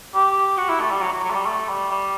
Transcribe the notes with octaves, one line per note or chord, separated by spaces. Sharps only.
G4
F#4
E4
A3
G3
F#3
F#3
F#3
A3
G3
A3
G3
G3